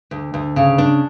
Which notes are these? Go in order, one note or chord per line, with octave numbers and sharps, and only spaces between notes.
D2
D2
C#3
D4